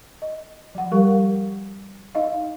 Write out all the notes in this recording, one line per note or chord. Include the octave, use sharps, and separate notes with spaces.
D#5
F3 F#5
G3 G4 A#4 F5 C#6
D#4 D#5 F5